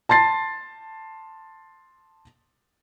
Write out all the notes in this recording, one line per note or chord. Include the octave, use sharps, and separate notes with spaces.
A5 C6 A6 C7